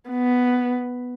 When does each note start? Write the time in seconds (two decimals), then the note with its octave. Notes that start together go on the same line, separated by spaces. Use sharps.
0.10 B3